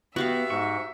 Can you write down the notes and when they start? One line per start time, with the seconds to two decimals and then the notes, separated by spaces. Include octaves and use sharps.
0.16 B3 F#4 G4 E5 F5
0.50 G#2 C#6